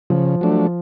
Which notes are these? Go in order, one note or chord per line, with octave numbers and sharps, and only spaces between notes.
C#3 F3
F#3 A3 D4